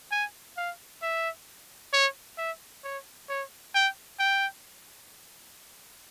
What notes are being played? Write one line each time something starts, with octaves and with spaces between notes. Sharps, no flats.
G#5
F5
E5
C#5
E5
C#5
C#5
G5
G5